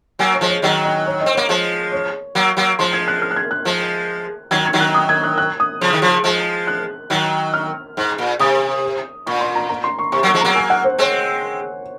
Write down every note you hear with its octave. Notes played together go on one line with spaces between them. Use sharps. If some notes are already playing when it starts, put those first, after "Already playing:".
F#3 A#3 G#5
C#5
F3 G#3
C#5
D#3 F#3 D#5
D#5
C#5
D#5
C4
A#3 C#5
F3 G#3
C#5
F#3 A#3
F#3 A#3
F3 G#3 C6
G#6
F#6
F6
F#6
G#6
F#6
F3 G#3
D#3 F#3 G#6
G#6
D#3 F#3
F#6
D#6
G#6
F#6
F#6
D#6
C#3 F3
D#3
C#3 F3
F3 G#3
F#6
D#3 F#3
F6
G#2
A#2
C3 D#6
A#2 C#6
C6
A#5
A#5
C6
C#6
C3 C#6
F#3 A#3
C#6
F3 G#3
F#3 A#3 A#5
G#5
F#5
C5
G#3 C4 C#5